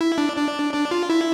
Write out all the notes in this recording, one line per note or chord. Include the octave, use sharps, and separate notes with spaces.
E4
D4
D4
D4
F4
E4